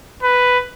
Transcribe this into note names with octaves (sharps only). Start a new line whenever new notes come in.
B4